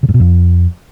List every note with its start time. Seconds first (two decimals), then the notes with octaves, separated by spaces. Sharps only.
0.03 C#3
0.09 G2
0.14 B2
0.20 F2